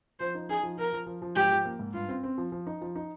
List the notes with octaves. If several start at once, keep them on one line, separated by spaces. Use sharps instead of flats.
F3 C5
D#4
D#4 G#4
F3
F3 A#4
F3
F3
F3
G#2 G4
F3
A#3
G#2
G2 F4
C4
C4
F3
F3
D#4
F3
D#4